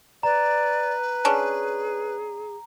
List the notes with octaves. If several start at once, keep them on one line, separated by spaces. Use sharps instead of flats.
B4 D5 A#5
C#4 D4 G#4